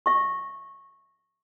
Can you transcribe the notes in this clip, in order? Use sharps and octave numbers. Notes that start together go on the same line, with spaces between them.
E5 C#6